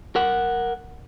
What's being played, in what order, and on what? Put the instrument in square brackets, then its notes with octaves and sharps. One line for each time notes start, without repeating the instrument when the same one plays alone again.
[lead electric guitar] A#4 F#5